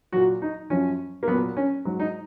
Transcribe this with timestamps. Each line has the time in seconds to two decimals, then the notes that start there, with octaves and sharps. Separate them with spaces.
0.12 A#2 F#3 F#4
0.42 D#4
0.70 F#2 F3 C#4
1.23 A#3
1.28 F#3 B3
1.32 A#2
1.57 C#4
1.85 G#2 F#3
2.00 D#4